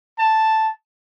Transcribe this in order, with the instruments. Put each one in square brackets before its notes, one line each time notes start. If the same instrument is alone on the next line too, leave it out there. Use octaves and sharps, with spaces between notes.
[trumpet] A5